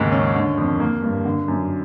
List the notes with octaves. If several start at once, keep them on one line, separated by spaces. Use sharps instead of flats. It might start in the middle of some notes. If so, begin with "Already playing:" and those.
Already playing: D#2 G#2 C#3
C#4
D3
F2
A#3
G2
D3
F#2